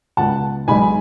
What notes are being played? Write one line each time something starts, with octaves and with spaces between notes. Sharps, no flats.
C#2 B2 G#3 F#5 A5
B1 B2 G#3 D#4 G#5 B5